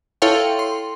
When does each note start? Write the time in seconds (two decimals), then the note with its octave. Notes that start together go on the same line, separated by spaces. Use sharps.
0.22 E4 A4 C#5 F5 G5 C6
0.59 C6